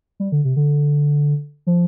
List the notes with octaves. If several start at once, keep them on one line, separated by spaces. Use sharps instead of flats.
G3
D3
C3
D3
F3